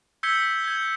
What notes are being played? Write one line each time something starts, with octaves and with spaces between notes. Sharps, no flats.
E6 G6 G#6 B6 C#7 G7
G6 G#6